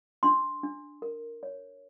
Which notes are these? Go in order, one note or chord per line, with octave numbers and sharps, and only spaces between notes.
D4 C6
D4
A#4
C#5